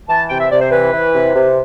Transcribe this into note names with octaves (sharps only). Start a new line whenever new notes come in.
E3 A5
C3 G5
E5
C3 D5
C5
E3 B4
E3
C3
C3